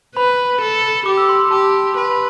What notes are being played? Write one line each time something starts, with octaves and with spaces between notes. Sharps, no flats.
B4 B5
A4
G4 D6
E6
C6
C6
G4 A5
B4 B5
C6
B5